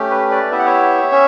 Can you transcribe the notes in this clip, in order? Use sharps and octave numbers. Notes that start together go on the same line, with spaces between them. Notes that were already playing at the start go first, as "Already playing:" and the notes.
Already playing: A3 C#4 G4
B4
B4 D5
B3 E4 G4 E5
F#5
C#5 E5
C#4